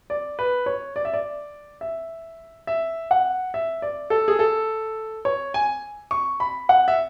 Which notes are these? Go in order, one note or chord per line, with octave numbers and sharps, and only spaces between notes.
D5
B4
C#5
D5
E5
D5
E5
E5
F#5
E5
D5
A4
G#4
A4
C#5
G#5
C#6
B5
F#5
E5